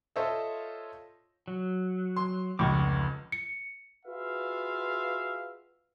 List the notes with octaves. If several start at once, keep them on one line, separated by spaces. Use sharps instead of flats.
F4 A4 C5 C#5 D#5 E5
F#3
C6
F1 C#2 F#5 C#6 D6
C#7
F4 F#4 G#4 B4 E5 F5